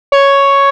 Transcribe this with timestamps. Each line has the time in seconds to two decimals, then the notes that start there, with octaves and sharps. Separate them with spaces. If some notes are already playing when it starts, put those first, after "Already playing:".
0.12 C#5